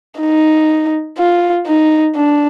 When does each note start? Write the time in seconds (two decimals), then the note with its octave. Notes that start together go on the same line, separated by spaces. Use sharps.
0.20 D#4
1.18 F4
1.67 D#4
2.15 D4